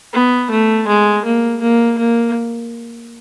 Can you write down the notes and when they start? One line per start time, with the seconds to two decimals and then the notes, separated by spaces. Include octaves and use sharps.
0.14 B3
0.51 A3
0.88 G#3
1.25 A#3
1.62 A#3
1.98 A#3